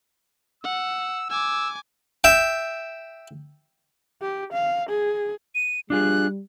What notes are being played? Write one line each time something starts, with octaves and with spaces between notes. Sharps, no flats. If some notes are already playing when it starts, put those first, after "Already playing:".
F#5 E6
G#5 D6 E6
E5 G5
G4
F5
G#4
D#7
G3 D4 F4 G#4 F#6